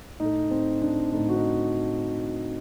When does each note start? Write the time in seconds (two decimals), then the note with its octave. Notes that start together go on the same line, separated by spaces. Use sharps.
0.20 A2 A3 D#4
0.51 C4
0.82 D4
1.13 A2 A3 D#4
1.29 F#4
1.36 D#4